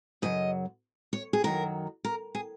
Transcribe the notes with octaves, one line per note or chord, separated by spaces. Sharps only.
F#2 C#3 F#3 D#5
C#5
G#4
F#2 D#3 F#3 A#4
A#4
G#4